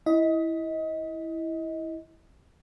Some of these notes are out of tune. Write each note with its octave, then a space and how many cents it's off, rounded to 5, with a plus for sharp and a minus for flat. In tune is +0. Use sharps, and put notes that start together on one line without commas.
E4 -5 D#5 +25